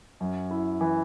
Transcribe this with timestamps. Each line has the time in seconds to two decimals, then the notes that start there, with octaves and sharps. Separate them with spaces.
0.20 F#2
0.51 E4
0.81 E3